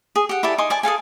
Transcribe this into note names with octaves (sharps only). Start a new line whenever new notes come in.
G#4
G4 F#5
E4 G4 A4 D5
D#4 G#5 C6 D6
D5 G#5 A5
G#4 A4 F5 G#5